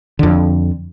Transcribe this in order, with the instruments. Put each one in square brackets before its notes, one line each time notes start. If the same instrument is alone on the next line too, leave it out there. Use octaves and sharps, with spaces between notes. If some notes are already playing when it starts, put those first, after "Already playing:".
[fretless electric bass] F2 D3